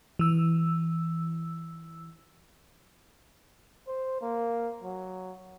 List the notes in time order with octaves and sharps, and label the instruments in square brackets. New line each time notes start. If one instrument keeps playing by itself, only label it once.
[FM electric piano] E3 E6
[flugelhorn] C5
A#3
F#3